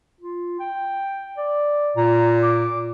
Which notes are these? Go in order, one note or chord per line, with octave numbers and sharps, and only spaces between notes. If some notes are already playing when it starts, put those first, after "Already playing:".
F4
G5
D5
A#2 A#5
D6